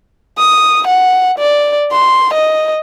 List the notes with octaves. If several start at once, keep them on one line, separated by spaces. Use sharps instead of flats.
D#6
F#5
D5
C6
D#5